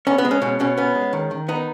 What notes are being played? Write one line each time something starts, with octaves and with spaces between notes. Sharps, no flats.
B3 C#4
B3
G#3
C#4
B2 C#4
B2 C#4
B3 C#4
G#3
D#3
D#3
B3 D#4